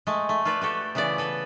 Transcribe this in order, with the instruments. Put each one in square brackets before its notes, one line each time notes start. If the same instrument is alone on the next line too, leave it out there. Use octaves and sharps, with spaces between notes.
[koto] G#3 A3 D#5
A3
F4 A4 B4 D5
F#4 G4 A4
C#3 E3 B3 E4 D5
A4 B4